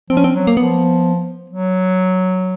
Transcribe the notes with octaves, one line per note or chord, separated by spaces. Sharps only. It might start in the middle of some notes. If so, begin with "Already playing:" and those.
F3 C4
C#4
C4
F#3
A#3
F3 B3
F#3